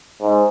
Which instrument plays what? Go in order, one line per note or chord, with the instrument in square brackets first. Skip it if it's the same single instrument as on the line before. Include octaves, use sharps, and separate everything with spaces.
[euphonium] G#2